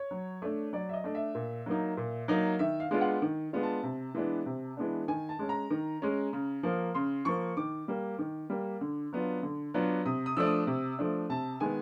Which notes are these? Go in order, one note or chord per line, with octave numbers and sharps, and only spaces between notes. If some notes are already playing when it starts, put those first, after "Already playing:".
Already playing: C#5
F#3
A3 D4
F#3 D5
E5
D#5
A3 D4
E5
A#2
F#3 A#3 D#4
A#2
F#3 A#3 D#4
D#3 E5
F5
G#3 B3 D4 F4
F#5
D#3
G#3 B3 D4 F4
A5
C3
E3 G#3 B3 D4
C3
E3 G#3 B3 D4
D#3 G#5
A5
G#3 C#4
A#5
D#3
G#3 C#4
C#3
F3 A#3
C#3 C6
F3 A#3 C#6
D#3 D6
G3 A#3
D#3
G3 A#3
D3
F#3 B3 D4 F4
D3
F#3 B3 D4 F4
C3 D#6
D#6
F3 A3 D4 E6
D#6
C3
F3 A3 D4
C3 A5
D#3 G#3 B3 G#5